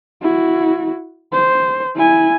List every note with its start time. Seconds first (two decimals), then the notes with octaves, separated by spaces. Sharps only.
0.22 E4 F#4
1.32 C5
1.96 E4 G#5